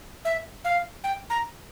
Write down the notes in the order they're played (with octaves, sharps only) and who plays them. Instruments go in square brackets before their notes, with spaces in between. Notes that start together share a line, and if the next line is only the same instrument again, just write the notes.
[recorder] E5
F5
G5
A#5